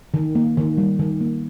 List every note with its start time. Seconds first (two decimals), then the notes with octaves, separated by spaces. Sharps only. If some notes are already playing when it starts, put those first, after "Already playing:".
0.14 D#3
0.35 A#3
0.57 D#3
0.78 G3
0.99 D#3
1.21 A#3